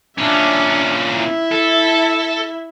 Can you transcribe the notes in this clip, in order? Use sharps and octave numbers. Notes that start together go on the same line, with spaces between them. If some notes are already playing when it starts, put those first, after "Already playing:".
A#2 C#4 D4 E5
E4 E5
A4